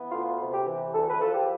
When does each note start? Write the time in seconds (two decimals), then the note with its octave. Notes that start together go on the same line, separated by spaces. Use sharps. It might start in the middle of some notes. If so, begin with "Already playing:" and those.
Already playing: E3 B3
0.12 D2 F4
0.40 C3
0.53 G4
0.66 E3
0.93 D2 A4
1.09 B4
1.21 F3 A4
1.34 G4